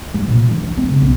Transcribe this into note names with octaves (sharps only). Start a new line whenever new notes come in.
G3
A#2
E3
F4
C4
C#3
B1